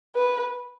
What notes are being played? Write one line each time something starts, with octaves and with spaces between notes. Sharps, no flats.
B4